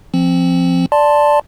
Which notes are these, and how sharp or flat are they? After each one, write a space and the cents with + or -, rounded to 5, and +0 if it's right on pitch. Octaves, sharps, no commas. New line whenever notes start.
F3 -15 C4 +10
D5 +0 A5 +0 C6 +0